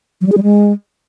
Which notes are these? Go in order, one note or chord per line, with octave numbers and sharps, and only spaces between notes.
F#3
G3
G#4
G3
G#3